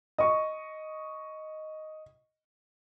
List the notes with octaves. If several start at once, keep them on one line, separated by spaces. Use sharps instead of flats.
D#5 C#6